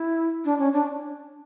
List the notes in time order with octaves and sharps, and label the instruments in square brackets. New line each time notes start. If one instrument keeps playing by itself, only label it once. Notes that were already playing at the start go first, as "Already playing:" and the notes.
Already playing: [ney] E4
D4
C#4
D4